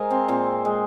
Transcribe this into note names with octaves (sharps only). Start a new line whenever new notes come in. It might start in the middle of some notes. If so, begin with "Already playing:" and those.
Already playing: G#3 A#4 C5 F5 G#5
C4
A#2 C4
G#3